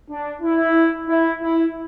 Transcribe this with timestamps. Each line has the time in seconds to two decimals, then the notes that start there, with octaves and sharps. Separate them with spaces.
0.09 D4
0.42 E4
1.07 E4
1.41 E4